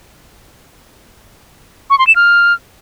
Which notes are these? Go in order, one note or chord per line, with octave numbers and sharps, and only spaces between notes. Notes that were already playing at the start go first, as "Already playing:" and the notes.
C#6
C6
E7
F6